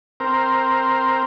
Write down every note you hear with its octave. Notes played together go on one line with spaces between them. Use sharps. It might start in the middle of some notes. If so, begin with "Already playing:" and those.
C4 A#4